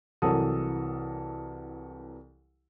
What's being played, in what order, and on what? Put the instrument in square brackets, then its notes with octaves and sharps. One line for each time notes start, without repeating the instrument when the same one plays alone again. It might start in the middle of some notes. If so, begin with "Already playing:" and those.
[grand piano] C2 E3 F#3 A4 A#4 D#6